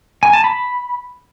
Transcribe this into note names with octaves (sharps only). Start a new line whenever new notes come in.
G#5
A5
B5